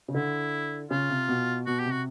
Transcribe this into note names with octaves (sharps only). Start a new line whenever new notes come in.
C#3
D3 E4
C#3 F4
C3
B2
B2 F#4
G4
C3
F#4